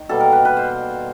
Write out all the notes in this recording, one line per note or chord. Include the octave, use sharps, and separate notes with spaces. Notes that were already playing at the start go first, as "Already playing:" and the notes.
Already playing: D#3
B2 G3 A#3 A4
A#4
B4
B4
C5